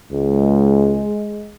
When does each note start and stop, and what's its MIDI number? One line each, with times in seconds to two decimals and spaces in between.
0.12 1.09 37
0.12 1.55 56